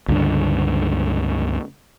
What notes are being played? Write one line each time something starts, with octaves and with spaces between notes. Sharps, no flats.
C#2 G2 D3